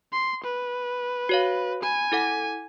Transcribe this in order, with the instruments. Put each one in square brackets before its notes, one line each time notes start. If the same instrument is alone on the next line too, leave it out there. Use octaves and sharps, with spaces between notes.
[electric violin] C6
B4
[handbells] F#4 C#5 F5
[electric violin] G#5 [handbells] B5
[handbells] E4 A4 F#5